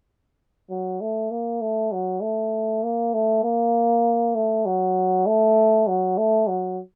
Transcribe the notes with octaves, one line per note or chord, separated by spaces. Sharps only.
F#3
A3
A#3
A3
F#3
A3
A#3
A3
A#3
A3
F#3
A3
F#3
A3
F#3